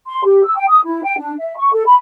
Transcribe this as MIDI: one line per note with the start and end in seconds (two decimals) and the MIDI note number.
0.07 0.21 84
0.25 0.44 67
0.44 0.56 88
0.56 0.66 79
0.68 0.80 87
0.85 1.00 64
1.03 1.17 79
1.17 1.33 62
1.38 1.54 76
1.57 1.72 85
1.73 1.83 69
1.86 1.94 83